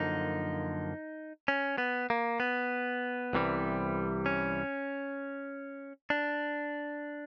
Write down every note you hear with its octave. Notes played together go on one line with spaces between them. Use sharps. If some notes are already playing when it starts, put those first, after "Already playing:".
Already playing: F#2 D3 F3 A#3 D#4
C#4
B3
A#3
B3
C2 C3 E3 G3
C#4
D4